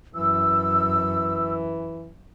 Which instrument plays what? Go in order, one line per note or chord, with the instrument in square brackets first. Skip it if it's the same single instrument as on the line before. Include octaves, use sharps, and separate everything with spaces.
[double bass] F#2 [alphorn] E3 [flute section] E6